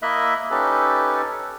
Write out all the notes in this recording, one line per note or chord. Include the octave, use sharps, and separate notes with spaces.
A#3 E4 D#5 E5 B5 F#6
C#4 D#4 G4 A4 B4